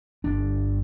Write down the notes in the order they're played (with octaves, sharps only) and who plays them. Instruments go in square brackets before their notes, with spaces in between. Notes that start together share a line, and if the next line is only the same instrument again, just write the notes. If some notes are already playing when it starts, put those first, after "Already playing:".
[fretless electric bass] G1 D4